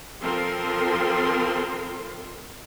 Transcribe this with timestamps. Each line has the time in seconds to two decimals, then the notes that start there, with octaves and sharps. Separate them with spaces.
0.22 F3 C4 F4 A4 A#4 C6